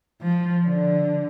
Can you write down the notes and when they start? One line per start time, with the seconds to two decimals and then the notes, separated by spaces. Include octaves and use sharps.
0.22 F3
0.66 D3